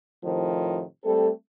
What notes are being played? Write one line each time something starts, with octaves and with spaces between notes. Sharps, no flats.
A2 C3 D#3 F3
G3 A3 C4 A4